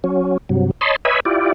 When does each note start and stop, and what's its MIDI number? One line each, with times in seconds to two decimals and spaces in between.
0.04 0.37 54
0.04 0.37 61
0.49 0.71 43
0.49 0.71 48
0.49 0.71 54
0.81 0.96 73
0.81 0.96 75
0.81 0.96 81
0.81 0.96 83
0.81 0.96 84
1.05 1.20 71
1.05 1.20 73
1.05 1.20 75
1.05 1.20 76
1.05 1.20 80
1.05 1.20 83
1.25 1.53 64
1.25 1.53 65
1.25 1.53 67
1.25 1.53 74